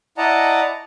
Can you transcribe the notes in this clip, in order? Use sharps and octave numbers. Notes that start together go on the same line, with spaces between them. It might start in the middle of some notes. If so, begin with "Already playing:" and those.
E4 D5 D#5 F#5 A5 A#5